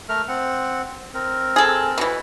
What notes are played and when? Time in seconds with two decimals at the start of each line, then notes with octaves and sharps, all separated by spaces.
0.09 A3 A#4 F6
0.28 C4 F#5
1.14 C4 A#4
1.56 G#4 A4
1.98 B2 E3